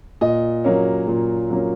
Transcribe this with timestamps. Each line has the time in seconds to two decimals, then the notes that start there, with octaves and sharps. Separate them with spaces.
0.21 A#2 D#5
0.64 F#3 A#3 C#4
1.08 A#2
1.50 F#3 A#3 C#4